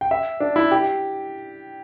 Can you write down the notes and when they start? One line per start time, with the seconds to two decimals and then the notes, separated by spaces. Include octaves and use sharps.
0.01 G5
0.11 E5
0.40 D4
0.56 E4
0.71 G4